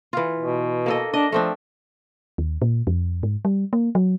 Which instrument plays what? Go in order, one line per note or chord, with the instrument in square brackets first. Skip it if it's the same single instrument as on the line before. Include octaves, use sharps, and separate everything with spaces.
[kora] E3 F4
[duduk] B2
[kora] A#3 A4 D#5
[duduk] D4 [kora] D#5
[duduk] F3 [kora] A3 C4 D4
[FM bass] D#2
A#2
F2
G#2
G3
A#3
F#3